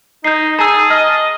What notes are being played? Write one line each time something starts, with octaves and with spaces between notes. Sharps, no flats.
D#4 G6 C7
G#4 A5 A#5 E6
D#5 F6